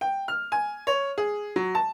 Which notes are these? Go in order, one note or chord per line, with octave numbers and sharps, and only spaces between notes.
G5
F6
G#5
C#5
G#4
F#3
A5